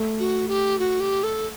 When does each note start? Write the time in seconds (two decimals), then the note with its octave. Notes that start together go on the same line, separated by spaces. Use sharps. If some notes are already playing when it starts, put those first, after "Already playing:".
Already playing: A3
0.19 F#4
0.48 G4
0.79 F#4
1.00 G4
1.23 A4